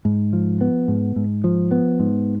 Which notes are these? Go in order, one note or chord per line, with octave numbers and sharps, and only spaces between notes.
G#2
F3
B3
G#2
G#2
F3
B3
G#2